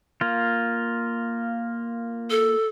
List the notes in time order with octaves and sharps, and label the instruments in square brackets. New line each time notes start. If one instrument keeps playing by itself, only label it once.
[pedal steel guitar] A#3 F4
[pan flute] A4